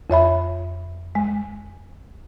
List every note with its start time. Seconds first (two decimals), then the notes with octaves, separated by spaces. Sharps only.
0.10 F2 C#5 E5 B5
1.15 G#3